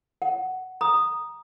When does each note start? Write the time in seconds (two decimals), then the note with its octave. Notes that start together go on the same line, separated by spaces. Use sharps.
0.22 F#5
0.81 A#5 D#6